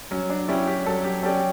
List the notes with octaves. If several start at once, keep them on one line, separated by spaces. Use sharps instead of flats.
F#3 C#4
D4
C#4 E4 G4 D5
G4
F#3 A4
G4
C#4 G4 A4 D5